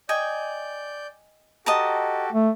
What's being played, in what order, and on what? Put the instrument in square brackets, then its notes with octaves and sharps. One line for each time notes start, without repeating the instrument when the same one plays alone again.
[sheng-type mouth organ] D5 G6 [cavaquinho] D#5 G5 G#5
[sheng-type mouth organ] F#4 G4 A4 [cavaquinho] D#5 A5 A#5
[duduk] A3